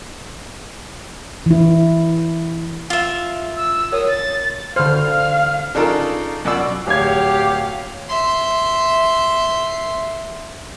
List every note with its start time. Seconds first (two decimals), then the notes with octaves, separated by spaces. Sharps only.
1.46 E3 E4
2.90 F4 E5
3.56 E6
3.92 A#4 C#5 D#6
4.08 A6
4.76 D3 C5 F5 F6
5.75 C#3 D4 D#4 F4 A4 A#4
6.45 F#2 B2 F4 D5 E6
6.87 D1 G4 C#5 F5 G#6
8.08 E5 C6